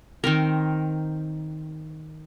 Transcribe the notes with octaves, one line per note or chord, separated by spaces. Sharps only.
D#3 C4 A#4